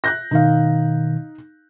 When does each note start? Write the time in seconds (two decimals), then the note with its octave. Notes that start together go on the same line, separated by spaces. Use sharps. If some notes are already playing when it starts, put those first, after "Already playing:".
0.04 F#6 G6 A#6
0.31 B2 D#3 D#4 F5